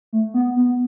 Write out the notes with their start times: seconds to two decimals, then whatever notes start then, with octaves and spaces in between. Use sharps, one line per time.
0.13 A3
0.34 B3
0.56 B3